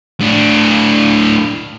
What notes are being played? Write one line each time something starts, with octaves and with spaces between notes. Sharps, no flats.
A2 D4